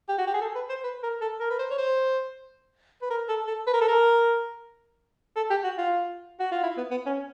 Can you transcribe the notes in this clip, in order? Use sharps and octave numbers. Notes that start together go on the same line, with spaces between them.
G4
F#4
G4
G#4
A4
B4
C5
B4
A#4
A4
A#4
B4
C5
C#5
C5
B4
A#4
A4
A4
B4
A#4
A4
A#4
A4
G4
F#4
F4
F#4
F4
E4
B3
B3
C#4